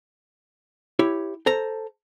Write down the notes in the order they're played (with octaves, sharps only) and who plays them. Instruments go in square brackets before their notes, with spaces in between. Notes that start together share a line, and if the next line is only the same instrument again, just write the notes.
[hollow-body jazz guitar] E4 G4 C#5
A4 C5 A#5